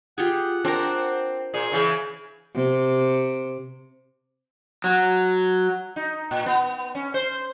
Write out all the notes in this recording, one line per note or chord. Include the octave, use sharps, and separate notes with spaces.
F4 G4 G#4 F#5
C4 D4 A#4
A#2 G#4
C#3 E3
C3
F#3
D#4
A#2
B3
C#4
C5